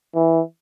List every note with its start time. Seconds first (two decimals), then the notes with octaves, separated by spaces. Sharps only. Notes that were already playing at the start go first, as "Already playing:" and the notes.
0.15 E3